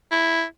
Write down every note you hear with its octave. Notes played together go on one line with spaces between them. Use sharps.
E4